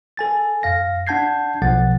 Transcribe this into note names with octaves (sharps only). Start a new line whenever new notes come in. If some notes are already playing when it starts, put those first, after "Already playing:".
A4 G#5 A6
F#2 F5 A#6
D4 F#5 A5 G6 G#6 C7
B1 B2 F3 F#5 A6